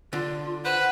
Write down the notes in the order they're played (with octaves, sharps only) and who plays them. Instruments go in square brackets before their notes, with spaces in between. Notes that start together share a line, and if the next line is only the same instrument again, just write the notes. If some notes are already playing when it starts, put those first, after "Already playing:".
[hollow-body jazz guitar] D3 [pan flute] F4
[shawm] B4 [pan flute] C5 [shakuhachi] F#5